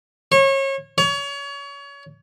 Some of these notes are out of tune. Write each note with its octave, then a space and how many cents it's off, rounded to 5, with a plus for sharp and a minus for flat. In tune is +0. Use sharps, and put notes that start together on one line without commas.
C#5 -30
C#5 +30